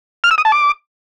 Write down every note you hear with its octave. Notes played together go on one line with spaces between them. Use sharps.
F6
E6
D#6
A5
D6